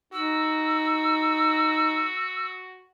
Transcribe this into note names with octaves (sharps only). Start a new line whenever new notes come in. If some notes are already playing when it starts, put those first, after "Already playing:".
D#4 F#4 E6